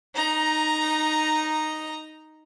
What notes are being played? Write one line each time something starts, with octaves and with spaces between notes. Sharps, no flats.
D#4 A#5